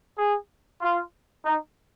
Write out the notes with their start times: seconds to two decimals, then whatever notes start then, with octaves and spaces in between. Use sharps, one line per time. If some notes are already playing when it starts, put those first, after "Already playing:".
0.17 G#4
0.81 F4
1.45 D#4